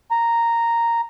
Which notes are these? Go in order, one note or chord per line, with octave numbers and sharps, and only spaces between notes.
A#5